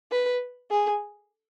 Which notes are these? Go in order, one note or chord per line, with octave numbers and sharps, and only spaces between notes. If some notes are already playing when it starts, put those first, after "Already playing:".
B4
G#4